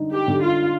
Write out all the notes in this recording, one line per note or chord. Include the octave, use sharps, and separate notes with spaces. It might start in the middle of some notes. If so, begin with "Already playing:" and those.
Already playing: D3 D#4
G4
D3
F4